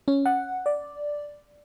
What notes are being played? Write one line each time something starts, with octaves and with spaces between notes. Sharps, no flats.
C#4
F#5
D5